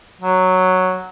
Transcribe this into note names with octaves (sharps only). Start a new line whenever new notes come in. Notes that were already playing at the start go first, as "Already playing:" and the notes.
F#3